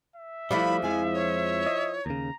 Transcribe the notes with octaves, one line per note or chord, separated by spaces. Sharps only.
E5
F3 G3 A3 D4 E4 B5
F2 G#3 G#5
C#5
D#5
D#2 C#3 A#5